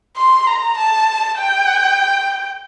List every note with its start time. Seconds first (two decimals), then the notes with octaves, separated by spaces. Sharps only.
0.17 C6
0.47 A#5
0.77 A5
1.38 G5